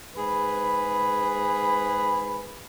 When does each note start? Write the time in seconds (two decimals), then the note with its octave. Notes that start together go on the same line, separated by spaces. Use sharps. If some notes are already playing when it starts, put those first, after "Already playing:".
0.16 G#2 G#4 B4 B5